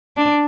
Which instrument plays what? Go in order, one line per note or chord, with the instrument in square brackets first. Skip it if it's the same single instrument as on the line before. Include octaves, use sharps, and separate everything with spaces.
[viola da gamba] D4